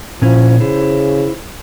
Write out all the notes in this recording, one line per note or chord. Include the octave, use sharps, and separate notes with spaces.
A#2 F3 C#4 E4
C#3 E4 C5